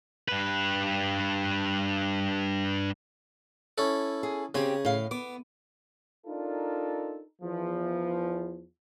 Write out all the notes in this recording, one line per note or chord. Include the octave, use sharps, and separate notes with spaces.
G2 B4
C#4 E4 A4
G#4
C#3 C4 G4 G#5
A2 F5
B3 D6
D4 D#4 F4 A4 A#4
E2 F3